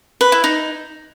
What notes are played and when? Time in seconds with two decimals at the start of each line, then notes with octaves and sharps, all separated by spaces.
0.21 B4
0.32 E4
0.44 D#4